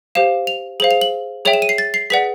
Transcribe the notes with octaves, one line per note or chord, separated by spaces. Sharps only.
G4 C5 F5 E7
F7
G#4 C5 F5 F#7
F7
F#7
G#4 C#5 E5 G5 F7
E7
D#7
C7
A6
C7
G#4 B4 D5 F#5 B6